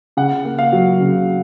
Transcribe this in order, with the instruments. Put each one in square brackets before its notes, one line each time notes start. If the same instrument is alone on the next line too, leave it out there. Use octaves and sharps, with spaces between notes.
[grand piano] C#3 F#5
A#3
F5
F#3
C#3